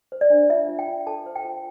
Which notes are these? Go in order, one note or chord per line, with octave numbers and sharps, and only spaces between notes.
C5
D5
D4
F4 E5
F4
G5
F4
A4 A5
C5
G5
F4